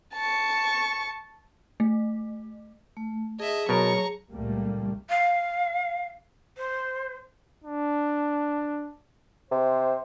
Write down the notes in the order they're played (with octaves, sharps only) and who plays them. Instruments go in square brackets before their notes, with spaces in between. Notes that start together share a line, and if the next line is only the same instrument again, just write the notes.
[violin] A5 C#6
[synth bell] A3
[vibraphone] A3
[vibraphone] G#4 A5 [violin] D#5 E5
[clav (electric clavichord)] B2 A#4 [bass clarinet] F#3 [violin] A#5 C#6
[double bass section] C#2 A#2 G3 A3 A#3
[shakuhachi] F5
C5
[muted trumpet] D4
[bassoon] C3 [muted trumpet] C5